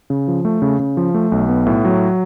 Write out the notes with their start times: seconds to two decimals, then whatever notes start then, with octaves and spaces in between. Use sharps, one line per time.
0.10 C#3
0.28 F3
0.45 A3
0.62 C#3
0.79 C#3
0.97 F3
1.14 A3
1.32 B1
1.49 B3
1.66 A2
1.85 F#3